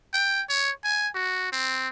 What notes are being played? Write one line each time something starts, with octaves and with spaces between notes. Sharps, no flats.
G5
C#5
G#5
F#4
C4